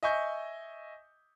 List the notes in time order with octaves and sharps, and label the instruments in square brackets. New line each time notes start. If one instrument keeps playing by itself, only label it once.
[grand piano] D#5 E5 G#5 C#6 G6